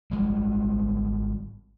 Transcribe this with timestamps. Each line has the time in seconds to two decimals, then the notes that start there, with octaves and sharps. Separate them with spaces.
0.11 G#1 G3 G#3